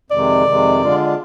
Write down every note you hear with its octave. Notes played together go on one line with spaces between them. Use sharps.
F2 C3 D#3 G#3 D5
F2 C3 D#3 G#3
D3 G#3 D4 F4